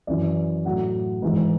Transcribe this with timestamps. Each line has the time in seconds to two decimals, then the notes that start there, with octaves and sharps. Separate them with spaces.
0.07 F#2 E3 D5
0.65 A2 F#3 F#5
1.22 G#2 E3